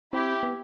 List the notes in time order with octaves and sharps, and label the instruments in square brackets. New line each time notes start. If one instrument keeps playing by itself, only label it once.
[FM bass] C4 [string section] E4 G4
[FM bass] B3